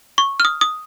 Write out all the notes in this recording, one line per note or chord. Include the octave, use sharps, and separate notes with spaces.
C#6
F6
D#6
D#6